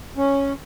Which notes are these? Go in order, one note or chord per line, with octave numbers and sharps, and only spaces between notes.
C#4